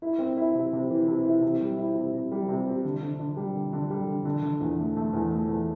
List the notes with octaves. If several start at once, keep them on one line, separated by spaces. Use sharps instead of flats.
E4
C4
E4
C3
C3
E3
C3
E4
C3
G3
E4
C3
C3
G3
C3
C3
D3
D3
D3
G3
D3
D3
G3
D3
D3
D3
E2
A3
A3
E2
A3
E2